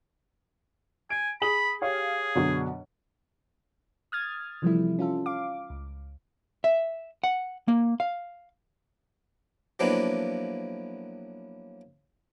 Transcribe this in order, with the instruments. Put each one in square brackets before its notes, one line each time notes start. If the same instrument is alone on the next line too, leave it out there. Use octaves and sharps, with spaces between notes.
[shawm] G#5 [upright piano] D7
[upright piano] G#4 D#6 F#7 [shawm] B5
[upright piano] G4 C#5 F5 [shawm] G#4
[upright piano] F#2 B2 D3
[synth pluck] D#6 F6 G#6 A6
C3 E3 F3 G3 A3 E4
C#4 F4 A4
F5 D6
C#2
[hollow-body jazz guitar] E5
F#5
A#3
F5
[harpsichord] F3 F#3 A#3 B3 D4 E4